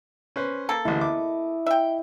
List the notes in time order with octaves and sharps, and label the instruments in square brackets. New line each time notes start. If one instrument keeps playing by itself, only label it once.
[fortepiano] C#4 B4 C5
[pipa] A#3 A4
[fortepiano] A1 D2 [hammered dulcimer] E4 D#5
[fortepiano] D6
[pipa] E5 G5